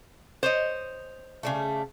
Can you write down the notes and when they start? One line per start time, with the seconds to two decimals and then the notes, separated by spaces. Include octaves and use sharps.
0.43 C5 C#5 D#5
1.43 C#3 G3 A3